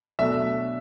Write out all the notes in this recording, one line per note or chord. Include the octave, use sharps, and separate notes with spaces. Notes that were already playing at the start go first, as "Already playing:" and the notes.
B2 F#3 A3 D4 E5